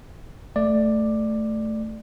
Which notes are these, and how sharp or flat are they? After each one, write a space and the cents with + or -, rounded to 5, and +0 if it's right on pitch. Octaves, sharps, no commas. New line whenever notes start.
A3 +0 D5 +10